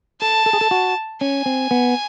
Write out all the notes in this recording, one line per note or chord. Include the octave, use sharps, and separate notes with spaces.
A4 A5
A4
G#4
A4
F#4
C#4 G#5
C4
B3